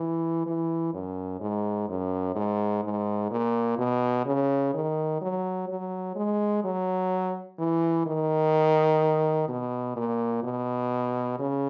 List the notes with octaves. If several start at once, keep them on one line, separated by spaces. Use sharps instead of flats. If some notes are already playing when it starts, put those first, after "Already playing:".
Already playing: E3
E3
F#2
G#2
F#2
G#2
G#2
A#2
B2
C#3
D#3
F#3
F#3
G#3
F#3
E3
D#3
B2
A#2
B2
C#3